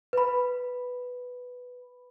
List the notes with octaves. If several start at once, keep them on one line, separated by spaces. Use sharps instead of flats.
B4 B5